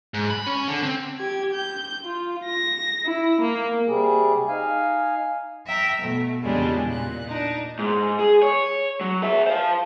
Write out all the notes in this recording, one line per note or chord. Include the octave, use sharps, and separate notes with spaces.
G#2
B5
C#4
D3
C4
G4 G#6
G6
F4
A#6
E4
A#3
C3 G3 G#4
D#4 F5 G#5
E5 G5 A#5
B2 A3
E2 A#2 C#3 G3 G#3 D4
A#2 F#6
D4 D#4
G#2
G#4
C#5
F#3
G#4 E5
C5 F5